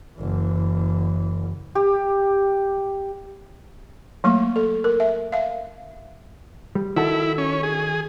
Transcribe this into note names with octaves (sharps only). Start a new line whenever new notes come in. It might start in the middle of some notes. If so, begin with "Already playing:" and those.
F#1 E3
G4
F#3 A3 A#3 C#6
A4
A#4
E5
E5 F5
G3
D#3 E4 F#4 A4
C#4
G#4